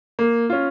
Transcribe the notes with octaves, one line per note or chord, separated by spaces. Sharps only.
A#3
C#4 F4